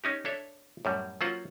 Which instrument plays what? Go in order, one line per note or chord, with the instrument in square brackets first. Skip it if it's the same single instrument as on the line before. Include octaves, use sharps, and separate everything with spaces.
[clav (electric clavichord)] C#4 D#4 G4
D4 A4 C#5 E5
F#2 A2 G3
F#3 A#3 C#4 F4 C5 F#5